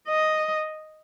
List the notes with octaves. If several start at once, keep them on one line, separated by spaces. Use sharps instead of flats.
D#5